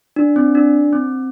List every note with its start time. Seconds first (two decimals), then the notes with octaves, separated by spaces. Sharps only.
0.16 D4
0.36 C4
0.55 D4
0.93 C4